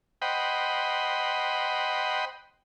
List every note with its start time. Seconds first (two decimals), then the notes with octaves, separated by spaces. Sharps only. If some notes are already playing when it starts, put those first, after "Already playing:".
0.22 C5 D#5 F#5 G5 B5